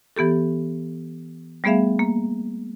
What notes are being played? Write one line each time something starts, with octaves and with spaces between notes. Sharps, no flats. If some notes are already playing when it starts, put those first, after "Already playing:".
E3 B3 G4 A4
G3 A3 B3 G#4 E5 F5
A#3